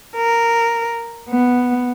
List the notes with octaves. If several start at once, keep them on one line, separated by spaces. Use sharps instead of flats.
A#4
B3